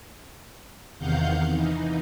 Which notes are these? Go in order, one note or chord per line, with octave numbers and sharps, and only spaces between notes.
E2 C3 D#3 F5 F#5 G6
E3 D#4